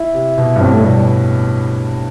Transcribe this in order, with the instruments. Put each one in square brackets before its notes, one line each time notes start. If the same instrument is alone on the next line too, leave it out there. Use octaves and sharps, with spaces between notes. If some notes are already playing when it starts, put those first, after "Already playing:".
Already playing: [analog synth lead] E4
[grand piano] C3
B2
G2
[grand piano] A2 [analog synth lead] C4
[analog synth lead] A3
[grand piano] B2 [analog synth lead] G3
[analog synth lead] G3